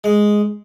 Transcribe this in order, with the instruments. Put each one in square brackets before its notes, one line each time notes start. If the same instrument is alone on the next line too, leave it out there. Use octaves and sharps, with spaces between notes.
[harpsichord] G#3